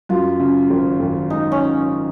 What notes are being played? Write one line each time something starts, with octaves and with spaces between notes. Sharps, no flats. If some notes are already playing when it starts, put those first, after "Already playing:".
F#2 F4
C#3
G#1
G#1
G#3 D#4
C#4